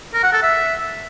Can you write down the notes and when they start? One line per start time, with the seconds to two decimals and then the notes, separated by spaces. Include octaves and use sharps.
0.14 A#4
0.23 F#5
0.33 A4
0.43 E5